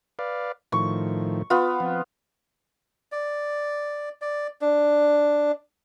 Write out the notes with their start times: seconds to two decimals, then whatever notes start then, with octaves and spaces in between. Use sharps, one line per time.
0.19 B4 D5 F5
0.72 A2 D#3 F3 C#6
1.50 B3 F4
1.80 F3 C4
3.12 D5
4.22 D5
4.61 D4